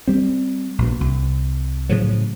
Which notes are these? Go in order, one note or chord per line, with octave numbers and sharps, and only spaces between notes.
G3 C4
A#1 B2
C2
A2 C#3 F3 F#3